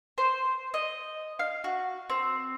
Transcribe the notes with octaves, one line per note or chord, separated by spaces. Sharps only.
C5
D#5
F5
F#4
C4